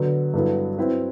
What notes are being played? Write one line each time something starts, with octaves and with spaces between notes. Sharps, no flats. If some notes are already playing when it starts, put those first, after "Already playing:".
Already playing: D3 F#3 B3
G2 F#3 B3 E4 A4
F#3 C4 E4 B4